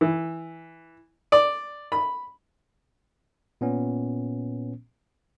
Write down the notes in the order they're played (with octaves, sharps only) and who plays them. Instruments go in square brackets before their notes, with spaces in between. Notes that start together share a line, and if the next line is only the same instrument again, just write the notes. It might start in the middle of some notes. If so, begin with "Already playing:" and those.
[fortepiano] E3
D5
B5
[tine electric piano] A#2 B3 C#4